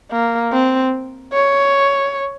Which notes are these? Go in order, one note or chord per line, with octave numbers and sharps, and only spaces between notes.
A#3
C4
C#5